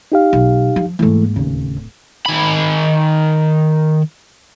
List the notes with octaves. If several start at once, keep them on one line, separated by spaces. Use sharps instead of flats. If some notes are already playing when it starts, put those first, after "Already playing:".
D#4 G4 F5
B1
F3
G#2 E3 A3 A#3
D1 D#2 C#3
D#3 B5